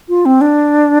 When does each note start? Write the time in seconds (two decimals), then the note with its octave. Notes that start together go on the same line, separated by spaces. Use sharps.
0.09 F4
0.26 C4
0.41 D4